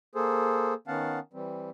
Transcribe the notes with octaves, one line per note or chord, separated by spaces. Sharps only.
A#3 G#4 A4 C5
D#3 B3 C#4 F5 F#5 A5
E3 G3 C4